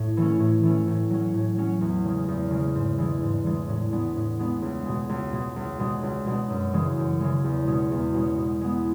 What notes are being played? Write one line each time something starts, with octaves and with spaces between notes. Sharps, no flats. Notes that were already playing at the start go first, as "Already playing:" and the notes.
Already playing: A2
E3 A3 C#4
A2
E3 A3 C#4
A2
F#3 C#4
A2
F#3 C#4
E2
C#3 G#3
E2
C#3 G#3
G#2
E3 G#3 D4
G#2
E3 G#3 D4
A2
G#3 B3 D4
A2
G#3 B3 D4
C#2
B2 G#3
C#2
B2 G#3
C#2
B2 G#3 D4
C#2
B2 G#3 D4
F#2
C#3 E3 G#3
F#2
C#3 E3 G#3
E2
B2 G#3 C#4
E2
B2 G#3 C#4
B2
G#3 B3 E4